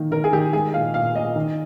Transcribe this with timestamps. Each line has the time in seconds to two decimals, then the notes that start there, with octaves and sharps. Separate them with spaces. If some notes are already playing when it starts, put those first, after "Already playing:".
Already playing: D#3 A#3
0.11 D#3 A#4
0.24 G#4
0.33 D#3 G4
0.53 G#3 G#4
0.74 A#2 F5
0.94 A#2 F5
1.15 A#2 D#5
1.36 D#3